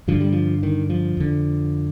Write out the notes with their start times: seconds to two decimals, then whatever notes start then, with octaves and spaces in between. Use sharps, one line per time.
0.08 G2 D3 F3
0.20 G3
0.32 F3
0.63 D#3
0.90 F3
1.17 F2 D3